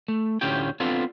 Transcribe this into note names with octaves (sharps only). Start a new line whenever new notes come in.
A3
D2 A2 C#4 F4 G4 G5
B3 C4 D4 F4 A4